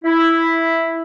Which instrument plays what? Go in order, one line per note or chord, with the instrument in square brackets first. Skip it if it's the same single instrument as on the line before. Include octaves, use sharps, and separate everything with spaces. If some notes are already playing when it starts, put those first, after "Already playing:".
[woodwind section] E4